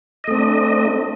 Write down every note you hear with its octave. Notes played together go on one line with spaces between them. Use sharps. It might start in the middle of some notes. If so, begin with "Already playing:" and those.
A3 C4 D4 D#5